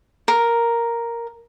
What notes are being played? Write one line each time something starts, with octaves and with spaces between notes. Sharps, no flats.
A#4